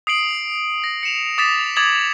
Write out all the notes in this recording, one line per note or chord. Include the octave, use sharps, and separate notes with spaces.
D#6 C7 D7 F#7
A#6
C#7 E7 F7
D6 D#6 A6 B6 E7 F7
D6 D#6 G#6 A6 F7 F#7